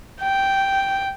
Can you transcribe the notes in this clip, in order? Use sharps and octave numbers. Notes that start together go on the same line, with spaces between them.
G5